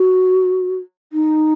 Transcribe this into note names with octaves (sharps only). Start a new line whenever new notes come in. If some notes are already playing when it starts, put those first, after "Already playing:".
Already playing: F#4
D#4